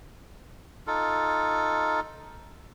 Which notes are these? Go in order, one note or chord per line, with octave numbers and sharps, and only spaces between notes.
D#4 F4 A4